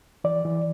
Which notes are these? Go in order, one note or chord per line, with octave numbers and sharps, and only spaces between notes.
E3 D5
E3